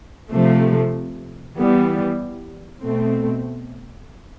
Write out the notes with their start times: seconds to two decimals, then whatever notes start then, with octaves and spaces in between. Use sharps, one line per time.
0.31 C3 F3 A3
1.57 E3 G3 B3
2.84 B2 A3 C4